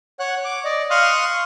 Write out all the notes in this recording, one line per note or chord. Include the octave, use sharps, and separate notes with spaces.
C#5 F#5 F#6
D6
D5 D#5
F5 C6 C#6 D#6 F6 F#6